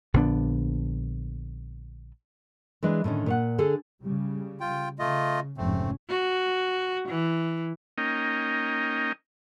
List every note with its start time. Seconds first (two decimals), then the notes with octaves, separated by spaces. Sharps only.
0.14 A#1 D3 B3 D4
2.83 E3 G#3 D4 B4
3.04 A2 D3 D#3 C#4
3.26 A#2 C#5 F#5
3.58 D3 G#4 A4
4.02 C#3 G3
4.60 F4 G5
4.99 C#3 A3 F4 D#5
5.58 F1 G#2 A3 C4 C#4
6.09 F#4
7.09 E3
7.98 A#3 C#4 D#4 A#4 D#5 G5